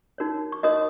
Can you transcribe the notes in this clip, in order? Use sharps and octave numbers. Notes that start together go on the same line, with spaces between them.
D#4 F#4 A#4 C#5
C#6
D#4 F#4 A#4 C#5 D#5 D#6